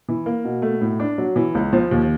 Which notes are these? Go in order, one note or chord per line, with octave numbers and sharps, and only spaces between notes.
E3
A#3
B2
A3
A2
D4
F#3
E3
C#2
F3
D#2